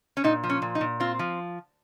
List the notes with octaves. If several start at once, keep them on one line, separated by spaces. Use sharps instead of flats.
C#4
A#2 D#4
F3
C#4
A#2
D#4
A#2
C4 F4
F3